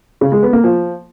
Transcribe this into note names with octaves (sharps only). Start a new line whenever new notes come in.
C#3
G#3
B3
A#3
F3